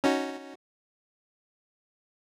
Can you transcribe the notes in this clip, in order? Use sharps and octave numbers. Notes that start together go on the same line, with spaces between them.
C#4 D#4 F#4